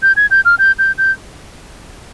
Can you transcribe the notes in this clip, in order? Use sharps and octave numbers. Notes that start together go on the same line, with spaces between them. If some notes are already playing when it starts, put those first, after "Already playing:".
G6
G#6
G6
F6
G6
G6
G6